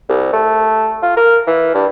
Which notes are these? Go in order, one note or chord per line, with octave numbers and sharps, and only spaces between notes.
C2
A3
F4
A#4
E3
G2